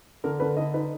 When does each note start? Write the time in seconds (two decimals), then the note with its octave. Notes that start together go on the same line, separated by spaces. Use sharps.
0.24 D3 A#4
0.40 D3 B4
0.57 D3 D#5
0.74 D#4 B4